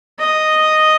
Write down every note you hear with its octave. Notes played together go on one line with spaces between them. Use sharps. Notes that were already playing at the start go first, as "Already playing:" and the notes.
D#5